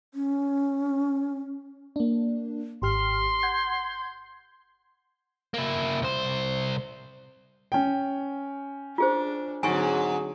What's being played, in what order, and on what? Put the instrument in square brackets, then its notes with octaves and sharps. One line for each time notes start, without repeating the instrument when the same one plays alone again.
[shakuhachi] C#4
[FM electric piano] A#3 D4
[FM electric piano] G#1 G4 F6 [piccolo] C6
[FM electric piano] F#5 G6 G#6
[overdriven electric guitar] A#3 E4
C2 C5
[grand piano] C#4 G5
[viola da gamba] D4 [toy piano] F4 G#4 C5
[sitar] G#2 [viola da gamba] D3 F#3 C4 [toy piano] G#5 C#6